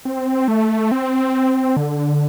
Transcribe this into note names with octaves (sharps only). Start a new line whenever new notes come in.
C4
A3
C4
D3